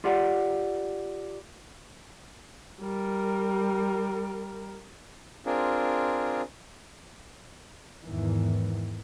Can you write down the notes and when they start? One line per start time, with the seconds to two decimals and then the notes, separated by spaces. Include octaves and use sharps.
0.04 F4 G4 D5 F#5
2.81 G3 A#4
5.46 C4 D4 F4 G#4 A#4
8.03 E2 G#2 D#3 E3